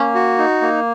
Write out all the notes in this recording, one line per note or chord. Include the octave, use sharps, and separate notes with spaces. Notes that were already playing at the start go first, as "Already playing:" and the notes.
Already playing: A#3 C#4
F#4
D#4
A#3